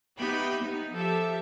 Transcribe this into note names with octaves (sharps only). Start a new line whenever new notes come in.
B3 D#4 G4 E5 G5 B5
B3 D#4
F3 G4 A4 E5